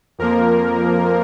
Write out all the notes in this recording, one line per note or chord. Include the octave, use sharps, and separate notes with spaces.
F2 F3 A#3 A#4